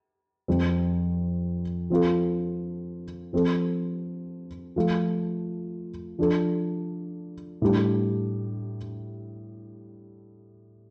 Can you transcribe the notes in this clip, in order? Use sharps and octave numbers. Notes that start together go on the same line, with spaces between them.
F2 F3 C4
F3 C4 F4 A4
F3 C4 A4
F3 A3 F4
F3 D4 A4
A2 G3 D4 G4